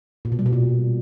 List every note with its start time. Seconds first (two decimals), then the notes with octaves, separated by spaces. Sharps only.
0.25 A#2
0.32 B2
0.39 G3
0.46 B2
0.53 A#2